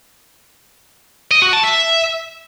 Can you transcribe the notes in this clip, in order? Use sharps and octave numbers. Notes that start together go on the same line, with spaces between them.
D#5
F#4
A5
E5